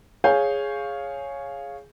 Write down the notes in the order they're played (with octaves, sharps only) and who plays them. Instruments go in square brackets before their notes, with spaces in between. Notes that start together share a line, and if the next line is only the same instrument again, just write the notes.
[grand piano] G#4 C#5 F5 G#5 G6